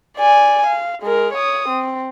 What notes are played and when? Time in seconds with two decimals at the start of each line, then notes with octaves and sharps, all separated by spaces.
0.17 D5 G#5
0.67 F5
1.03 G#3 A#4
1.33 C#5 D#6
1.69 C4